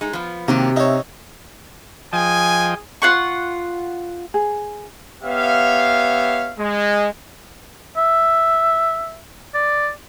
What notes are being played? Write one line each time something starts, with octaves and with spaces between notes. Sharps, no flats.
G#3 D#4
F3 B3
C3 D#3 F#3 A#3 G4
D#4 C#5 E5
F3 G#4 D#5 G5 G#5
F4 F#5 C#6
G#4
B3 G4 C#5 E5 F5
G#3
E5
D5